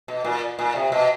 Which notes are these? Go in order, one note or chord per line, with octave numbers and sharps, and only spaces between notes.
B2
A#2
A#2
C3
B2